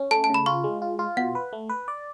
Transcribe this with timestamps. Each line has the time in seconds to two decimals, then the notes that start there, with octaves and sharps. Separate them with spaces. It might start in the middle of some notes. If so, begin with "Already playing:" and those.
Already playing: C#4
0.11 A3 A5
0.24 A5
0.30 C#3 B5
0.46 F4 C#6
0.64 G#3
0.82 F4
0.99 F4
1.17 B2 F#5
1.35 B4
1.53 A3
1.69 B4
1.88 D5